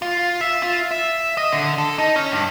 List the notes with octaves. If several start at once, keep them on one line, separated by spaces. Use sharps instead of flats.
F4
E5
F4
E5
D#5
D3
A4
D#4
C#4
G2